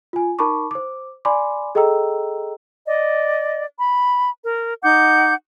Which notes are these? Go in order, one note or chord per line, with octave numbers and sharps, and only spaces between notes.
F4 G#5
D#4 A#4 A5 B5 C#6 D6
C5 D6
D5 G#5 B5 C6 D6
G#4 A4 D#5 G5 A#5 E6
D5 D#5
B5
A#4
D#4 F#5 D6 G6